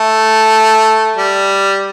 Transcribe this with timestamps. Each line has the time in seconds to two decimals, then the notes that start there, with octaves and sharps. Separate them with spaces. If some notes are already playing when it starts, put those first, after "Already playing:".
Already playing: A3
1.17 G3